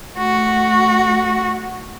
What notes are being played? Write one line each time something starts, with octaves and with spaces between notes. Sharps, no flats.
A3 F#4